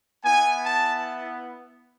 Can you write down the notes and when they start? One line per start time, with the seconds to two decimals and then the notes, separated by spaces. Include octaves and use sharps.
0.24 B3 E4 G#5
0.64 A5